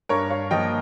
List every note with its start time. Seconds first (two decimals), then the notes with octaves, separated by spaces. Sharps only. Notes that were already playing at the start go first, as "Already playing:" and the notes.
0.09 G2 A#4 C#5
0.30 C#5 F5
0.51 F3 A#3 D#5 G5